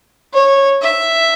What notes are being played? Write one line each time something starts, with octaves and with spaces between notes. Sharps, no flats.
C#5
E5